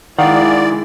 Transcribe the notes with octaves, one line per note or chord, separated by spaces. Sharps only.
D#3 G#3 E4 D5 F5 F#5